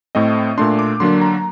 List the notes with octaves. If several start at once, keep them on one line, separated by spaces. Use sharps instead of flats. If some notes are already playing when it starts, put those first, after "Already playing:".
A2 A3 C4 D#5
A#2 A3 D4 C6
D6
D3 F#3 A#3 D4 C6
A#5